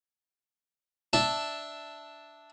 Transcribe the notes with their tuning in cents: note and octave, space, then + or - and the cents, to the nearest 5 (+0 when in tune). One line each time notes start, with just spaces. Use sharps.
D4 +0 E5 +0 A5 +0